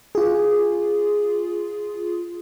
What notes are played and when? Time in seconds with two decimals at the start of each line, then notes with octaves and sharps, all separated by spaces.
0.15 F4 G#4